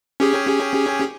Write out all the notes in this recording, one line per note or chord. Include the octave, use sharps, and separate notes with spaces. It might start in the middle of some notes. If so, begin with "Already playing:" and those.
C#4 G4 G#4